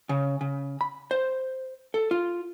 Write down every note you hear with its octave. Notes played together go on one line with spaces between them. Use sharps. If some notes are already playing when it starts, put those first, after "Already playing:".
C#3
C#3
B5
C5
A4
F4